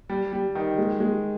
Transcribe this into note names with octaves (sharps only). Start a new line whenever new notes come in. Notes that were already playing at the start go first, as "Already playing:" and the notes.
G3
G3
D#3
G#3
G#3